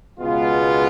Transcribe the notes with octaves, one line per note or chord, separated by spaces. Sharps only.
C#2 B2 G#3 B3 F4